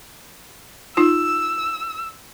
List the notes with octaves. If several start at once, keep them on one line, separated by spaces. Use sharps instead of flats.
D#4 F4 E6